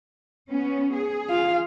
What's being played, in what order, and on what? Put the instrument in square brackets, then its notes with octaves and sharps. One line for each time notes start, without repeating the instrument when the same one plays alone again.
[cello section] B3 C#4
G#4
[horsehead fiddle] F4 F5